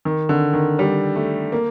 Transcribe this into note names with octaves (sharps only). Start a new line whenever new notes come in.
D#3
D3
D#3
G3
A3
A#3